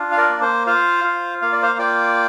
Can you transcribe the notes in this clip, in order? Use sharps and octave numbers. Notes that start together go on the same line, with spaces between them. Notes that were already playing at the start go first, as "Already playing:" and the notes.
Already playing: D4 F4
F5
A#4 D5
A#3
C5
F4 C5 F5
F4
A#3 F5
D5
C5 F5
F4 D5 G5